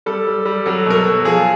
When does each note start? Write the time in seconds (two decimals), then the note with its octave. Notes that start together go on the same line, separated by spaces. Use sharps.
0.06 G3 A4
0.27 G3
0.45 G3
0.66 F#3 A4
0.86 B2 A#4
0.96 A4
1.06 F#3
1.25 F3 G#4